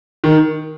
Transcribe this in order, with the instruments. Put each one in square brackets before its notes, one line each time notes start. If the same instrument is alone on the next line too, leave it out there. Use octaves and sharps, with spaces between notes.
[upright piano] D#3